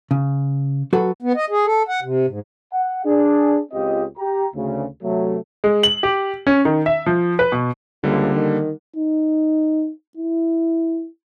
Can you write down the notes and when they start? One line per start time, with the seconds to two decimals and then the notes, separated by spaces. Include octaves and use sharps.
0.11 C#3
0.93 F#3 F#4 A4 B4
1.22 B3
1.36 D#5
1.50 G#4
1.66 A4
1.89 F#5
2.03 C3
2.27 G#2
2.72 F#5
3.04 D4 G#4
3.72 C#2 C4 F4 G4 D#5
4.17 G4 A#5
4.54 D2 C#3
5.02 C3 F#3 A3
5.64 G#3
5.83 F#7
6.03 G4
6.47 C#4
6.65 D#3
6.86 E5
7.06 F3
7.39 B4
7.52 B2
8.04 C#2 D3 G3 A#3
8.35 D#3
8.96 D#4
10.17 E4